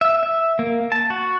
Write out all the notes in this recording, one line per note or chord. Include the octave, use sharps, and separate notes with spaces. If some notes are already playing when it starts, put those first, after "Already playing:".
E5
E5
A#3
A5
F#4